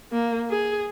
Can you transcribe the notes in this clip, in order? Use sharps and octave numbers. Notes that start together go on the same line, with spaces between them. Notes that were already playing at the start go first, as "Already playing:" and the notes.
A#3
G#4